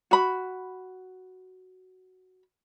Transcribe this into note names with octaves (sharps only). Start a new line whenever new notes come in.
F#4 B5